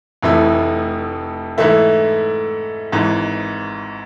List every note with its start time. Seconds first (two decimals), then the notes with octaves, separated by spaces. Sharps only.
0.23 F1 F2 E3 A3 E4
1.58 G#2 E3 A3 E4
2.92 G#1 G#2 E3